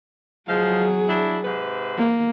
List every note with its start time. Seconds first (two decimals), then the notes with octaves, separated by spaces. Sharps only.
0.49 F3 F#3 G#3 G#4 F5
1.08 D4 E4
1.44 G#2 C3 B4
1.98 A#3